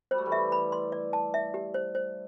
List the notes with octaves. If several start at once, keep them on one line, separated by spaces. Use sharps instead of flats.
G3 C5
A3
E3 G3
E5
B5
C6
D5
A5
E5
G4
C5
C5